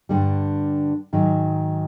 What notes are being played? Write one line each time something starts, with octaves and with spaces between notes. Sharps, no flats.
G2 D3 G3
G#2 D#3 F#3